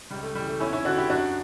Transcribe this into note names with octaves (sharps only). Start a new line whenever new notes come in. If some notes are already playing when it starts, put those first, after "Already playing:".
C#2 G3
A3
C#3 E3 G3
A3
E2 C#4 E4
C#4 E4
D3 D4 F#4
E4 G4
F#2 D4 F#4